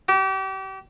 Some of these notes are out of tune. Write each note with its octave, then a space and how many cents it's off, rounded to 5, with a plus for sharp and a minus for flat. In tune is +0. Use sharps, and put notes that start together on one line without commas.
G4 -35